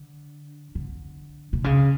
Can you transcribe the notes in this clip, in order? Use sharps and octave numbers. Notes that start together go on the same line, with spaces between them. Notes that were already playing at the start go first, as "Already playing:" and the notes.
Already playing: D3
D3
B2
C#3